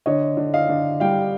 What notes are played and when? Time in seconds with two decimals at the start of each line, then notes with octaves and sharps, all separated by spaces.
0.06 D3 C#5 D#5
0.37 D3
0.54 D#5 F5
0.69 D3
1.00 G3 F5 G5